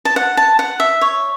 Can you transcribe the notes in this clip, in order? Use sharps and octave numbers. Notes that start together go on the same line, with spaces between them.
A5
F#5
A5
F#5
E5
C#5